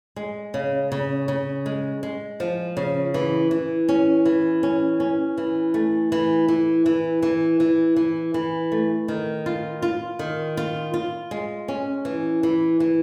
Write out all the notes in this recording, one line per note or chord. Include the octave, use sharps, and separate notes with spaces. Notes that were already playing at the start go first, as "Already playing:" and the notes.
G#3
C#3
C#3
C#3
G#3
G#3
F3
C#3
E3
E3
C#4
E3
C#4
C#4
E3
A3
E3
E3
E3
E3
E3
E3
E3
A3
D#3
F4
F4
D#3
F4
F4
G#3
C#4
E3
E3
E3